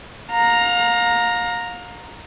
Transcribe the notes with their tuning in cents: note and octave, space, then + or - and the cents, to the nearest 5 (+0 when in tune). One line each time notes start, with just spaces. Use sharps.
F5 +35 A#5 +0